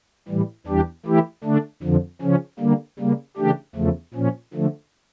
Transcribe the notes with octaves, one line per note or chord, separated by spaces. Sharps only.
A2 E3 G3
E2 E3 G3 D4 G4
E3 A3 E4 G4
D3 A3 D4
F2 D3 F3
C#3 F3 C#4
D3 G3 A#3
C#3 G3 A#3
C#3 E3 A3 D4 G4
E2 C#3 F3 A3
A#2 F3 C#4
D3 F3 A3